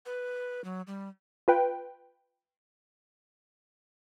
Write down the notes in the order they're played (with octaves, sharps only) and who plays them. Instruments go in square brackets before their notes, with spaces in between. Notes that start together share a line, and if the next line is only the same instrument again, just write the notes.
[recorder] B4
F#3
G3
[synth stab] F4 B4 G5